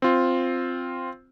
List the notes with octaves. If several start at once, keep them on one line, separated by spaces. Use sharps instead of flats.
C4 F4